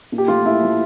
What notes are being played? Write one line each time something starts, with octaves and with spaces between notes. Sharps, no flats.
A#2
G4
F3 A3 F4
A#2 E4
F3 A3